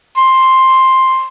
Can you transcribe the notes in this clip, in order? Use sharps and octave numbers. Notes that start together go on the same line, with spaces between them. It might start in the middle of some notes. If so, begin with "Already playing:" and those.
C6